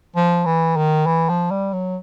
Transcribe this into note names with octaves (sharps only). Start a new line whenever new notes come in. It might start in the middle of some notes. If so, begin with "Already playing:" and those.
F3
E3
D#3
E3
F3
G3
F#3